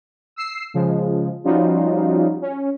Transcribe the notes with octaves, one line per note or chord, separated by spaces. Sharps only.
E6 C7
C#3 F3 G#3
F3 G3 C#4 D#4 F4 F#4
C#4